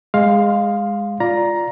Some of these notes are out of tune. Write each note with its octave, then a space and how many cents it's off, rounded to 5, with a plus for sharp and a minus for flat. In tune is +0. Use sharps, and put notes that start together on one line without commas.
G#3 -15 F5 +10 C6 +5
F4 +0 D5 -5 A#5 +10